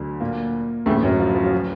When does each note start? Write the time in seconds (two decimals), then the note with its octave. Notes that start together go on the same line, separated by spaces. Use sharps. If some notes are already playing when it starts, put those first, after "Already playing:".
Already playing: D2 D3 F#3
0.20 A#2 A#3
0.86 D2 A2 C#3 E3 A3
1.03 F#2 F#3
1.20 F3
1.35 F3
1.44 F#3
1.51 F3